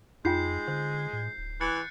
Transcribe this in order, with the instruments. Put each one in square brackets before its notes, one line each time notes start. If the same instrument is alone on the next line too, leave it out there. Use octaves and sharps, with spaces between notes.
[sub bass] F2 [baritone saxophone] G#3 [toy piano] D#4 F4 G5 [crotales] G6 C7
[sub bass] D3 [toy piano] C5
[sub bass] A2
D1
[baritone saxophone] E3 [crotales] F#6 A6 C#7